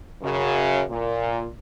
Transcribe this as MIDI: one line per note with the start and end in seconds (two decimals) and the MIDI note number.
0.23 0.82 42
0.23 0.82 49
0.90 1.47 46